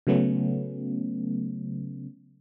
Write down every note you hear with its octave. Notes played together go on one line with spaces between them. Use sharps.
C#3 F#3 A3 B3 C#4